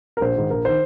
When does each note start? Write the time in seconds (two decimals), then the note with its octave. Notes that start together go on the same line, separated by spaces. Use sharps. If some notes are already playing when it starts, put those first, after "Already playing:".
0.17 A#4
0.21 A#1 C5
0.36 G#2 D#3
0.50 A#1 A#4
0.65 D#3 C5